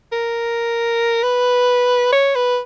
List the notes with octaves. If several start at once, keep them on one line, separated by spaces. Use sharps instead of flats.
A#4
B4
C#5
B4